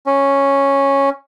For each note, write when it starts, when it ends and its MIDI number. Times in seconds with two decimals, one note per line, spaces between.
0.06 1.09 61